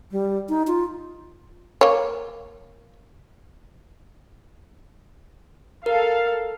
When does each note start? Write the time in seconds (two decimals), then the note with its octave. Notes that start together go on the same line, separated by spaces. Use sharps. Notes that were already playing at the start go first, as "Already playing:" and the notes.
0.12 G3
0.49 D#4
0.67 F4
1.81 A#3 C#5
5.86 A4 A#4 F5